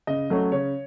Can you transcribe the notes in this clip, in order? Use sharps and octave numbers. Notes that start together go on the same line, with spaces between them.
C#3 D#5
F#3 A3 C#4
C#3 C#5